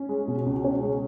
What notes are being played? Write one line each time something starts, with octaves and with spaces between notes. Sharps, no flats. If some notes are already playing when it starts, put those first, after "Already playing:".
Already playing: C#4
G#3
B2
C#2
C#4
G#3